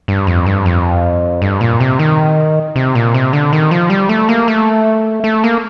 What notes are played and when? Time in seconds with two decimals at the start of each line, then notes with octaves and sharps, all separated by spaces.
0.08 G2
0.27 F2
0.46 G2
0.66 F2
1.42 G2
1.61 A#2
1.80 C3
1.99 D#3
2.76 C3
2.95 A#2
3.14 C3
3.33 D3
3.53 D#3
3.71 F3
3.90 G3
4.09 A3
4.29 A#3
4.48 A3
5.24 A3
5.44 A#3